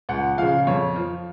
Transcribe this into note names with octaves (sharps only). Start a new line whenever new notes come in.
C#2 F#5
C#3 F3 F5
F2 C#5
F3